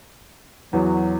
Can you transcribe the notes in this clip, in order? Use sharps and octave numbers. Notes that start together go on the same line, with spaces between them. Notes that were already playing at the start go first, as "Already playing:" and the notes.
E2 F#3